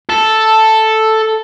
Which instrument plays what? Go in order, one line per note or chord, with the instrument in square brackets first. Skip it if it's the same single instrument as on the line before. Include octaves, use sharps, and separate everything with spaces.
[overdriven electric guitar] A4